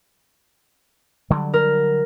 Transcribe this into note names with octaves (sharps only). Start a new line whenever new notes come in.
D3 F#3 G3
A#4